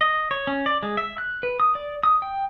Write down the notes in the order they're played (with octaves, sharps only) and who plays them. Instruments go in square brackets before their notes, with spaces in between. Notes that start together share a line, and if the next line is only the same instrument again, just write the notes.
[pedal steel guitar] D#5
C#5
C#4
D5
G#3
E5
F#6
B4
D#6
D5
D#6
G5